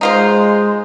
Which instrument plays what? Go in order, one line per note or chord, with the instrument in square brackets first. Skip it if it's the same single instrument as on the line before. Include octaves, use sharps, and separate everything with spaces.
[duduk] G#3 [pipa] D#4 F4 C5